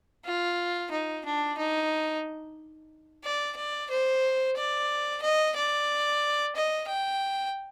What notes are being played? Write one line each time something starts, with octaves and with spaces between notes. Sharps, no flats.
F4
D#4
D4
D#4
D5
D5
C5
D5
D#5
D5
D#5
G5